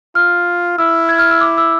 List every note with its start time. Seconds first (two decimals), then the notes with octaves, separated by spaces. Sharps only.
0.15 F4 F6
0.78 E4 E6
1.09 G#6
1.19 F6
1.31 E6
1.41 D6
1.58 E6